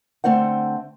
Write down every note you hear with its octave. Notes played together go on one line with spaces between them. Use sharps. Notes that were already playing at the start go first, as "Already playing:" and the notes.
D3 A3 C4 C5 F#5